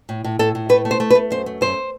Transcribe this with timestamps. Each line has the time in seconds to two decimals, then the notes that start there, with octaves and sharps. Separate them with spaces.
0.09 A2
0.24 A2
0.39 A2 A4
0.55 A2
0.69 A3 B4
0.85 A3
0.91 C5
1.00 A3
1.11 B4
1.15 A3
1.30 F#2 C5
1.46 A3
1.61 F#2 C5